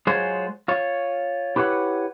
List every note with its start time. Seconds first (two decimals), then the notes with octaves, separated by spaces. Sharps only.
0.07 F#3 G#3 F4 G#4 C5 C#5
0.68 F4 C#5
1.56 E4 G4 B4 C#5 F#5